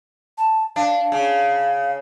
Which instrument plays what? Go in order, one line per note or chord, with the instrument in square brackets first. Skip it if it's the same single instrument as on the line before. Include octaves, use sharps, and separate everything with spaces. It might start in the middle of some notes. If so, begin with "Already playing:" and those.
[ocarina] A5
[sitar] D4 [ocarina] F5
[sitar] C#3